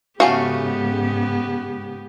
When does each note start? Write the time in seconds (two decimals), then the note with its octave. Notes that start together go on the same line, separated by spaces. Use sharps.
0.20 G#2 C#3 A3 B3 C#4 F#4 G4 F5